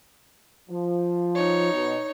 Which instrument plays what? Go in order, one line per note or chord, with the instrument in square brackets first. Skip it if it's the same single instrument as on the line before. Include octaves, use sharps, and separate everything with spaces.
[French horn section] F3
[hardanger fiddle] D#4 C#5
[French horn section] B2